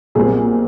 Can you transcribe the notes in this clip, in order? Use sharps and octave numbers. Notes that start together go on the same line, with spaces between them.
B1 A#2 G3 C4 G#4